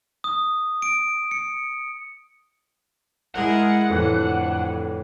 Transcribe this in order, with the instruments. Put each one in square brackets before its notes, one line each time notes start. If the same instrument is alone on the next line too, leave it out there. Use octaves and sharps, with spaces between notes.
[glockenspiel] D#6
D7
C#7
[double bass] G#3 [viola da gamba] E4 G#4 A#4 [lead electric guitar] F#5
[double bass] F2 [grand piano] A2 E3 A3 [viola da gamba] D3